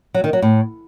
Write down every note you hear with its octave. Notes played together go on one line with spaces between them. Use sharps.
F#3
D#3
F#3
A2